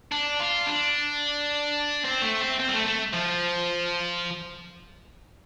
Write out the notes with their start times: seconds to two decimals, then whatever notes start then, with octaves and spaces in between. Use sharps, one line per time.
0.12 D4
0.40 F4
0.66 D4
2.05 C4
2.22 A3
2.41 C4
2.59 C4
2.68 G3
2.73 A3
2.86 A3
3.13 F3